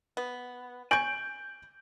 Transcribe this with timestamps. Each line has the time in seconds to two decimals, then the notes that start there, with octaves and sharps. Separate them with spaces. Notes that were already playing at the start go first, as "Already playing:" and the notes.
0.17 B3
0.91 G#5 C#6 G6 D7 F#7